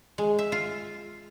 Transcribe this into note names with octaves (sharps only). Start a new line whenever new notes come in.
G#3
E5
F4